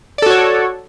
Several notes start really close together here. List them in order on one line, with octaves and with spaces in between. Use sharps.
D5 A4 F#4 C#5